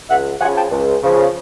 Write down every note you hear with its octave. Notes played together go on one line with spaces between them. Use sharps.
C#2 E5 F#5
C#3 F3 F#5 G#5
G5 A5
C#2
C#3 F3